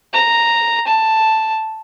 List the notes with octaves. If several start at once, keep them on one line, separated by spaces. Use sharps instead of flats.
A#5
A5